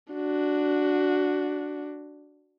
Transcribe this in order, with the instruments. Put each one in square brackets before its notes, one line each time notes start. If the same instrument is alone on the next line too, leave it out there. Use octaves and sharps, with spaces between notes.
[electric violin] D4 F#4